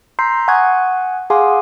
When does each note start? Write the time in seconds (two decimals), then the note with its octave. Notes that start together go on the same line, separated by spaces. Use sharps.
0.19 A#5 C6 E6 G6 B6 C7
0.48 F#5 G#5 C#6 D#6 F#6 G#6
1.30 G#4 F5 F#5 G#5 C6 D6